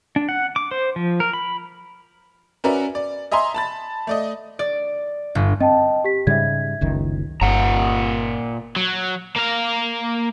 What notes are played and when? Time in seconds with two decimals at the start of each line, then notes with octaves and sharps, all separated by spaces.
0.16 D4
0.29 F#5
0.56 D6
0.71 C5
0.96 F3
1.20 A#4
1.33 B5
2.64 C#4 F#4 A#4 B4 D5 E5
2.95 D5
3.32 D#5 E5 G#5 A#5 C6
3.54 A5 B5 A6
4.07 A3 D5 D#5
4.59 D5
5.35 G1
5.60 C4 D#5 G5 A5
6.04 G4 B6
6.27 G#2 C#3 G3 E5 G#6
6.81 F#1 C#2 D#3
7.41 G1 A#2 F#5 A#5
8.76 F#3
9.36 A#3 F5